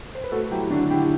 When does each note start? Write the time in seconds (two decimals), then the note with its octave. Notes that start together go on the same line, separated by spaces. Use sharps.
0.15 C5
0.24 B4
0.31 A3 F#4 A4
0.51 F#3 E4 G4
0.71 D3 D4 F#4
0.90 D3 E4 G4